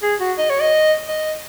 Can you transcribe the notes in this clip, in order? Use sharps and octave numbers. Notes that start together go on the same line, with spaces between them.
G#4
F#4
D#5
C#5
D#5
D#5